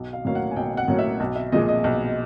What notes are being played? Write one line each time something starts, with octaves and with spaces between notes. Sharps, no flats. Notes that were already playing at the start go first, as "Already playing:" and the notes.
Already playing: B1
F5
A2 F#3 A#3 C#4 F5
F#5
G#5
B1 G5
F#5
A2 F#3 A#3 C#4
E5
B1
E5
A#2 F3 G#3 D#5
D#5
B1